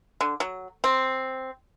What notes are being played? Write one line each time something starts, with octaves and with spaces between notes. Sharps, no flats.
D3
F#3
C4